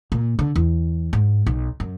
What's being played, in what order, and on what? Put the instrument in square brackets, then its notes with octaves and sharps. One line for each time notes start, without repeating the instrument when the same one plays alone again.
[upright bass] A#2
D3
E2
G#2
B1
F#2